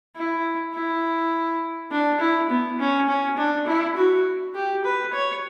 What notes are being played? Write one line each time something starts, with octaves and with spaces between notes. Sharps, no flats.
E4
E4
D4
E4
B3
C#4
C#4
D4
E4
F#4
G4
B4
C#5